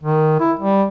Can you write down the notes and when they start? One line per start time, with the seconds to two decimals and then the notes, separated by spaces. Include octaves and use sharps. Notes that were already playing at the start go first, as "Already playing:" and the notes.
0.03 D#3
0.40 E4
0.60 G3